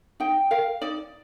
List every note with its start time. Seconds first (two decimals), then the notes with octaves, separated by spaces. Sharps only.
0.20 D#4 G5
0.51 A#4 F5
0.82 D#4 D5